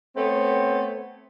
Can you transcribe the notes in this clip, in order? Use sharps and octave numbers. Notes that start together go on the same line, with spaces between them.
A3 B3 C4 C#5